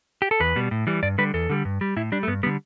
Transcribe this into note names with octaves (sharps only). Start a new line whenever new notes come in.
G4
A4
E2 B4
B2 G3
A2
E3 G3
G2 D5
D3 G3 B4
E2 A4
D3 G3
G2
G3
A2 E4
G3 D4
A3
G2 B3
D3 G3 B3